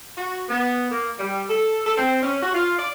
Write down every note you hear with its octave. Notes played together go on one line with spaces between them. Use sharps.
F#4
B3
A#3
G3
A4
A4
C4
C#4
F#4
F4
D5